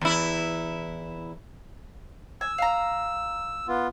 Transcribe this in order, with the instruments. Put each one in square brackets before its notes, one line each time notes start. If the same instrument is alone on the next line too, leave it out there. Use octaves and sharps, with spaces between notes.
[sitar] E2 E4
[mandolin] G#5 [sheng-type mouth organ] E6
[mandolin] F5 A#5
[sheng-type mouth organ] B3 F4